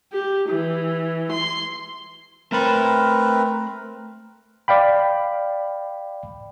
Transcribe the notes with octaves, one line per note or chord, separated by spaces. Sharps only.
G4
E3
C6
A3 C4 A#4 B4 B5
D5 F5 G5 B5